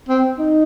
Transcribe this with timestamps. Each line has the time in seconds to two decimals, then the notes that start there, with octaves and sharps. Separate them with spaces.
0.09 C4
0.39 D#4